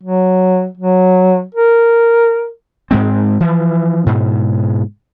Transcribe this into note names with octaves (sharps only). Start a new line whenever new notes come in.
F#3
F#3
A#4
G#2 G#3 C4
E3 F3
G#2 B2